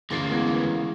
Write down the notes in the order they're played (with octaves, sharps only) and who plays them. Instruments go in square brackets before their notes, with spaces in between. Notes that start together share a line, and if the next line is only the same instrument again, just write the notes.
[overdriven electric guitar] D2 A#3 [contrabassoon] C#3 [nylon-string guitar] E3 [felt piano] C6 A6 C7
[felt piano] G#3 B3 G#6